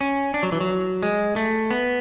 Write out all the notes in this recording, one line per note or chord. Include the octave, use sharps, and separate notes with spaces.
C#4
D4
F#3
E3
F#3
G#3
A3
B3